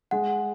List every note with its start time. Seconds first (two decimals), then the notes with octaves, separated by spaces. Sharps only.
0.11 G#3 F#5